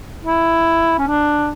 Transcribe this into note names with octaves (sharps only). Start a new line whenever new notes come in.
E4
C#4
D4